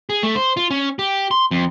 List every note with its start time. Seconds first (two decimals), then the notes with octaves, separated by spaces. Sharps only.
0.10 G#4
0.23 A3
0.35 C5
0.57 F4
0.70 C#4
0.99 G4
1.31 C6
1.51 F2